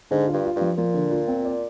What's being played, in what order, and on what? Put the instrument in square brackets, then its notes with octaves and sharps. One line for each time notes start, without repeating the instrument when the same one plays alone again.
[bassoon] G#2 [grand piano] D3
[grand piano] F4
[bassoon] G2
[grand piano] F4
[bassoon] G2
[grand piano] F3
[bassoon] A#2 [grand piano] F3
[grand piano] D3
F4
C4
D5